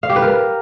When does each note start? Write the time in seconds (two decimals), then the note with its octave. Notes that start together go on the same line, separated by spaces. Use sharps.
0.03 F5
0.09 G4
0.16 B4
0.22 A#4